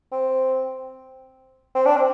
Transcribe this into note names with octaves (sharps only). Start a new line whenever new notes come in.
C4
C4
D4
C4